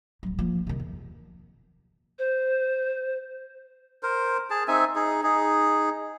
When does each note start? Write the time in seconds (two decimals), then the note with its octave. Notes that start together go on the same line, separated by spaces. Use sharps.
0.23 D1 F#3
0.38 F3 A#3
0.67 C3 D#3
0.80 E2
2.19 C5
4.03 A#4 C5
4.50 G#4 A5
4.68 C4 D#4 E5 G#5
4.96 D#4 G#4
5.23 D#4 G#4